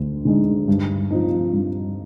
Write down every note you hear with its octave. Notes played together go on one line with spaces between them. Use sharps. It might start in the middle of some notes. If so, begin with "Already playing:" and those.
Already playing: D2 D3
D3 G#3 D#4
G2
F3 C4 D#4
G2